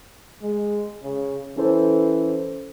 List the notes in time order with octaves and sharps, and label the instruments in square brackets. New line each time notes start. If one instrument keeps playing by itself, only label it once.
[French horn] G#3
C#3
[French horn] E3 [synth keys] C#4 A4 C5